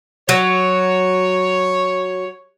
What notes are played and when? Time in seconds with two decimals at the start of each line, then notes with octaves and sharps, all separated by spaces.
0.29 F#3 C#5